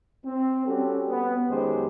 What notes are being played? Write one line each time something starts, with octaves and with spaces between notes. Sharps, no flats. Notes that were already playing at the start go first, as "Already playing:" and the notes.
C4
G3 C#4 F#4 G4 A4
B3
F#2 D#3 G#3 G4 C5